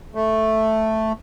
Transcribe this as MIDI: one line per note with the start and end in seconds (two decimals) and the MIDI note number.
0.15 1.13 57